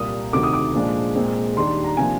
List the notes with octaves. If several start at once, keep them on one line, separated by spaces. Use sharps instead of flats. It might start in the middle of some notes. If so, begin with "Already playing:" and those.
Already playing: C2 A#2 G3 A#3 D#6
D2 C3 D#3 D6
D#6
D6
A#2 F3 G#3 D4
A#2 G#3 C4
D#2 D#3 G3 D4 C6
A#5
C3 F3 A#3 D4 G#5